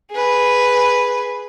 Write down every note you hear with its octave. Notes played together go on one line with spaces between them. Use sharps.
G#4 B4